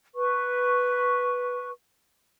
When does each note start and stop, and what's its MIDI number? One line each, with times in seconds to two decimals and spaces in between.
0.14 1.70 71
0.14 1.70 85